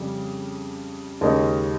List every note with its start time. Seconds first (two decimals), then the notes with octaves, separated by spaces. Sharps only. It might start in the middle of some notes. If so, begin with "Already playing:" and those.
Already playing: F2 C#3 G3
1.21 D#2 C#3 G#3 D#4